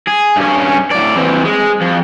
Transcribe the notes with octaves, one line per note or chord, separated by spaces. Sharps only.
G#4
G2 C#4
A2 D5
E3 C4
G#3
F2